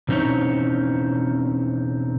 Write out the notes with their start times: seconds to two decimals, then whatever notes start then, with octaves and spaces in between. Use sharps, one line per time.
0.08 B2 E3 C4 C#4 D#4 C#5